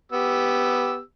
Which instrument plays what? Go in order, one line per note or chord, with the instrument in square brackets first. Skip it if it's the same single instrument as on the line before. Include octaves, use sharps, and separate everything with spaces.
[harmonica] B3 G4 E6